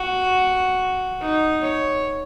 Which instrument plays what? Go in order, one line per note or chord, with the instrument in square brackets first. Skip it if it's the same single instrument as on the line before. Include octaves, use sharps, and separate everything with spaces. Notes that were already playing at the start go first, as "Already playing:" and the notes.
Already playing: [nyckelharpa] F#4
D#4
C#5